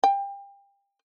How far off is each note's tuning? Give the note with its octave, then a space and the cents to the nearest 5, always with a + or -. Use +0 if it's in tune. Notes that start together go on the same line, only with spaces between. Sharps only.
G5 +30